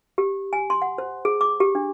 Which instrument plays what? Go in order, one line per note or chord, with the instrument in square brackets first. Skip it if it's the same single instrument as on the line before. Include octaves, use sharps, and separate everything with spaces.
[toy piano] G4
G#5
C6
F#5
C5
G#4
D6
G4
D4